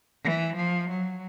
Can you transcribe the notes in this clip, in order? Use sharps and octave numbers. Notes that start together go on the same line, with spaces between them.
E3
F3
F#3